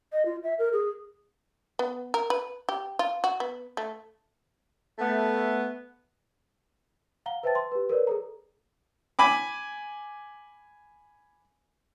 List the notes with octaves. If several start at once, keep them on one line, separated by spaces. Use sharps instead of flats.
D#5
F4
E5
A#4
G#4
B3
A#4
B4
G4
F4
F#4
B3
A3
A3 B3
F5 F#5 A#5 G7
B4 C5 E5 G5 A5 A6
C6
G4 B4
A#4 B4 C#5 D5
G#4 A4 A#5
G#5 B5 D6